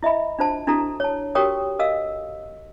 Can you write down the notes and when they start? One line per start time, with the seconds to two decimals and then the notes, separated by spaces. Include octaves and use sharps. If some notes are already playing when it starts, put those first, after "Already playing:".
0.03 E4 D#5 E5 B5
0.39 D4 F4 C5 A5
0.67 D4 E4 F#4 A4 A#5
1.00 C#5 A5
1.35 F#4 G4 A#4 C#5 G5 D#6
1.79 A4 A#4 D#5 F5 E6